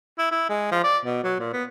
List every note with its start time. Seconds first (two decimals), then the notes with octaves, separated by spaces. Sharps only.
0.19 E4
0.31 E4
0.49 G#3
0.71 F3
0.84 D5
1.05 B2
1.24 F#3
1.39 A#2
1.53 B3